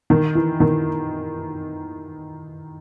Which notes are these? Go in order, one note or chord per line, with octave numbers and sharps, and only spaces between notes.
D#3
E3
D#3